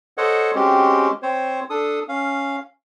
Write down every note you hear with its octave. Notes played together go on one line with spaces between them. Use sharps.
A4 C5 C#5 D#5 F#5
G#3 C4 C#4 F#4 G4
C4 C5 C#5
D4 A4 D#6
C#4 F5